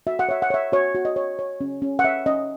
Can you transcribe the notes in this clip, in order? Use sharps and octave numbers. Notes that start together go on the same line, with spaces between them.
F#4 E5
F#5
C#5 E5
F#5
C#5 E5
F#4 C#5
F#4
D#5
C#5
C#5
C#4
C#4
F#5
C#5 E5
C#4 D#5